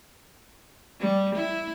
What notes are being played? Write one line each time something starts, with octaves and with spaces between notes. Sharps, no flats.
G3
E4